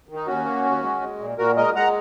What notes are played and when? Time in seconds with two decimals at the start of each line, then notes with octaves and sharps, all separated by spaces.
0.09 D#3
0.15 D#4
0.27 D#2 C#4 F#4
0.45 A#3
0.65 D#2
0.83 G#3
1.01 G#3
1.20 A#2
1.38 A#2 F#4 A#4
1.57 G#3 A#4 D#5
1.75 G#3 F#5 A#5